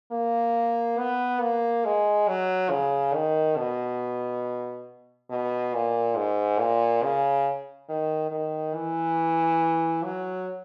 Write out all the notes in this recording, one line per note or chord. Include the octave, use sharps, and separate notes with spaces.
A#3
B3
A#3
G#3
F#3
C#3
D#3
B2
B2
A#2
G#2
A#2
C#3
D#3
D#3
E3
F#3